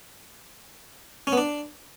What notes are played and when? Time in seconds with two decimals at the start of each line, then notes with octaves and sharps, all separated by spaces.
1.27 C#4
1.32 B3
1.38 D4